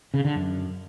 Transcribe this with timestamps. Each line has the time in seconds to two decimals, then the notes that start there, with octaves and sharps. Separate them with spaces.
0.14 C#3
0.25 D3
0.36 F#2